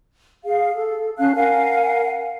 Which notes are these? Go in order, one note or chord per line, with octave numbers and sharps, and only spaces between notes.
G#4 F5
A4
C#4 F5 A5 F#6
A#4 F5 F#5 G#5